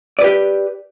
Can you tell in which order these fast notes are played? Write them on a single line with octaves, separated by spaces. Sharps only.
D5 B4 G4